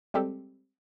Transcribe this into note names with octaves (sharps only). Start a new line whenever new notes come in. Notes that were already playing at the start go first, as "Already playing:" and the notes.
G3 G#3 C4 G4 A4